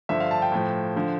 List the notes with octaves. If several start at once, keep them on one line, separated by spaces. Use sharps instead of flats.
G2 D3 F3 E5
F5
A5
G5
A2 F3
D3 F3